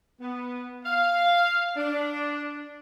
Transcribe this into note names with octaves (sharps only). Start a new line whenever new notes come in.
B3
F5
D4